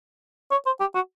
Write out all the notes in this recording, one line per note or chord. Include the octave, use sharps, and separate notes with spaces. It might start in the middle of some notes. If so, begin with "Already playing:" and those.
C#5
C5
G4
F#4